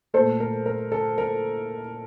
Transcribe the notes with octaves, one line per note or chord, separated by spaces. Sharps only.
A#2 A3 A4 C5
A#4
A#4
A4
A#4